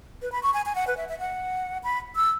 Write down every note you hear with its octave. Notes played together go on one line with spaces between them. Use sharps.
B4
B5
C#6
G#5
G#5
F#5
B4
E5
E5
F#5
B5
E6